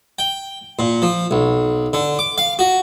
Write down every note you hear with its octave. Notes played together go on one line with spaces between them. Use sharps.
G5
A#2
F3
B1
D3
D6
F5
F#4